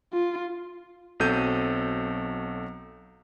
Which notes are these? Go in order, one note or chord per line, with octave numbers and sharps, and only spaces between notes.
F4
B1 F#3 C4 A4 G6 D#7